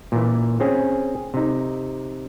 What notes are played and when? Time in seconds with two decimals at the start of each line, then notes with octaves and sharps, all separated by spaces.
0.12 A#2 E3
0.60 C4 C#4 G#4
1.34 C3 D#4